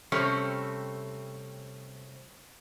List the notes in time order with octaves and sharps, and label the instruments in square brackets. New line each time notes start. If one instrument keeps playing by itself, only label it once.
[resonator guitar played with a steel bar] C3 G3 A3 C4 C#4